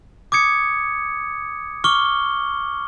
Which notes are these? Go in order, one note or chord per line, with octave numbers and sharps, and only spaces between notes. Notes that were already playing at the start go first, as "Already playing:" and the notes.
D6 D#6 G#6 C#7
C#6 D6 F6 G7